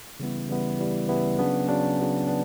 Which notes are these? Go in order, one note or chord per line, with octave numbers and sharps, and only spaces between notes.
C#3 E3 G3 B3 E4
C#3 E3 G3 B3 E4
C#3 E3 G3 B3 E4
C#3 E3 G3 B3 E4
C#3 F#3 B3 D4
C#3 F#3 B3 D4
C#3 F#3 B3 D4
B3 D4